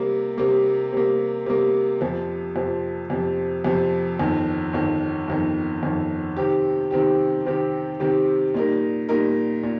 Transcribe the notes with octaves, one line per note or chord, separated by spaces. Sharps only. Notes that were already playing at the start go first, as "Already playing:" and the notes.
Already playing: C3 G3 A#3
C3 G3 A#3
C3 G3 A#3
C3 G3 A#3
F2 C3 F3
F2 C3 F3
F2 C3 F3
F2 C3 F3
G1 F2 D#3
G1 F2 D#3
G1 F2 D#3
G1 F2 D#3
C3 D#3 C4 G4
C3 D#3 C4 G4
C3 D#3 C4 G4
C3 D#3 C4 G4
A#2 G3 D#4 A#4
A#2 G3 D#4 A#4
A#2